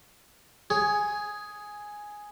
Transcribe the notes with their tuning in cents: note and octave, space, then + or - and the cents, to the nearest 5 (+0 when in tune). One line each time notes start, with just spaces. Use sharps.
G#4 +0 C#5 +15